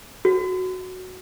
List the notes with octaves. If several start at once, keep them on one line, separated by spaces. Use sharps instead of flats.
F#4